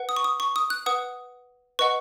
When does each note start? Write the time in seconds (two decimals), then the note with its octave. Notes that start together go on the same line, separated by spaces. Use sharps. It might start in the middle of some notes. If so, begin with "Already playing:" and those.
Already playing: B4 F#5
0.09 D#6
0.16 C#6
0.24 D#6
0.40 C#6
0.56 D#6
0.70 F#6
0.86 B4 F#5 D#6
1.79 B4 D#5 F#5 C#6